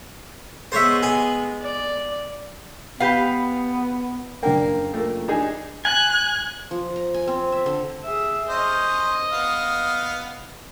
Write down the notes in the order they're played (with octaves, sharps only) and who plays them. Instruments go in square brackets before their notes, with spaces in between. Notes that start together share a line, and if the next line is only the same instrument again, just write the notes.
[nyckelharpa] G#3 B3 [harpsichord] C5 C#5 E5
[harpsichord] G#4
[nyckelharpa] D5
[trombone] B3 [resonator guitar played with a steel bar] G4 B4 F5
[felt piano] F#1 D4 G5 [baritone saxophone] A#3
[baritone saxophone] A#2 [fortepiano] A3 A#3
[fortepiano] D4 D#4 G#4
[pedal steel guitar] G#5 [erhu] F#6
[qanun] F3
A#5
G#5
C4
E5
D3
[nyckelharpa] G#4 E5
[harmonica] C#4 C5 [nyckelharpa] D#5
[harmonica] B3 F5